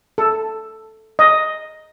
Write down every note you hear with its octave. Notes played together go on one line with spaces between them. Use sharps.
A4
D#5